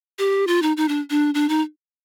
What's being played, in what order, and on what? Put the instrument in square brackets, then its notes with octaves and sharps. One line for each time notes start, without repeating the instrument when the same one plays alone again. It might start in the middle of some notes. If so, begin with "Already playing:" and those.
[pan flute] G4
F4
D#4
D#4
D4
D4
D4
D#4